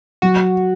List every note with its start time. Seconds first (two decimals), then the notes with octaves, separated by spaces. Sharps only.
0.22 F#3 F#4